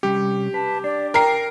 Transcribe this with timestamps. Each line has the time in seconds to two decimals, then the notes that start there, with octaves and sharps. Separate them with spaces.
0.03 C3 G3 C#4 G4
0.54 B4 A5
0.84 D4 D5
1.14 A#4 G5 A#5 C7